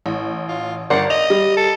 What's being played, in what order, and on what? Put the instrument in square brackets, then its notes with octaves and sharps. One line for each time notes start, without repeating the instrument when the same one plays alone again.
[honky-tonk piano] A1
[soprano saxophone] F4
[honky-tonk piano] G1 [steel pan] A#4 D5 C6 [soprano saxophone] F#5
[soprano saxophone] D#5 [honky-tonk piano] F7
[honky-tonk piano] G3
[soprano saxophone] A4